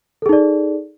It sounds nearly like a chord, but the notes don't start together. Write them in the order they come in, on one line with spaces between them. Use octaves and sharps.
A4 G#4 D#4 D5